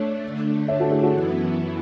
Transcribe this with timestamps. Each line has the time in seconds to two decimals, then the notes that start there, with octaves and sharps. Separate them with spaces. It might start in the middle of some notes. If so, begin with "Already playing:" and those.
Already playing: A3 D4 C#5
0.24 D3 A3 D4
0.68 C#5 E5
0.80 F#4 A4
0.91 E4 G#4
1.03 F#4 A4
1.14 F#2 E3 B3 E4